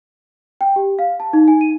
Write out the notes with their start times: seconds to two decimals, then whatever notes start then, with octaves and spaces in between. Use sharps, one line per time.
0.61 G5
0.76 G4
0.99 F5
1.20 A5
1.33 D#4
1.48 G#5
1.61 D#7